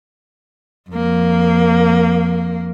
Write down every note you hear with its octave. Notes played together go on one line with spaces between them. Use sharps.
F2 A#3